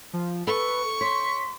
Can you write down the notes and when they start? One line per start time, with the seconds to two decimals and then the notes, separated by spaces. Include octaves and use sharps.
0.13 F3
0.47 A4 B4 C#6
1.01 C#5 C6 B6